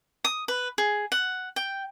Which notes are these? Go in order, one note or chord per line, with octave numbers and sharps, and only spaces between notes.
D#6
B4
G#4
F#5
G5